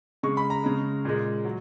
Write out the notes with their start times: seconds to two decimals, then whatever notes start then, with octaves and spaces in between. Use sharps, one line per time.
0.23 C#3 G#3 C#6
0.37 B5
0.50 A#5
0.64 C#3 G#3
1.05 A#2 G#3
1.45 F#3